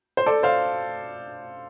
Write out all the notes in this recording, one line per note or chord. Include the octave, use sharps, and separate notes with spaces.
C5
A4 D5
C5 F5